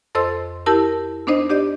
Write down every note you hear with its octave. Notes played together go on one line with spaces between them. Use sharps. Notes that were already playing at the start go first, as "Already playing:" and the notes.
F2 A4 C5 D#5 C6 E6
E4 G4 A#4 A5 E6
B3 D4 D#4 C5 D#5
D4 G4 D5 D#5